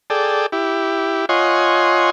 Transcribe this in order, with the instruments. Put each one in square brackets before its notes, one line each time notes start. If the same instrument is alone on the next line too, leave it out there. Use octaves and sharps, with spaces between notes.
[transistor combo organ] G#4 A4 D5 G5
E4 G4
F4 C#5 D#5 F#5 G#5 C6